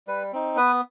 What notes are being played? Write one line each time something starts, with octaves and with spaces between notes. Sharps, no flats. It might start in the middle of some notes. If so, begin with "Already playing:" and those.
G3 B4
C4 D#4
B3 B4